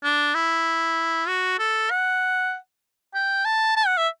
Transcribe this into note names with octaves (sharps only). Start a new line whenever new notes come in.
D4
E4
F#4
A4
F#5
G5
A5
A5
F#5
E5